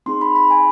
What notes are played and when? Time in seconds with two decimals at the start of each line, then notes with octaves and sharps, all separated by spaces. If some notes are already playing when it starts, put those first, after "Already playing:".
0.06 C4 D#4 G#4 C6
0.21 B5
0.35 B5
0.51 G#5